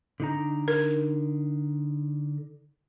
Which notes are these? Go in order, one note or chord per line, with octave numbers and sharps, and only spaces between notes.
D3 D#4 A#5
A#4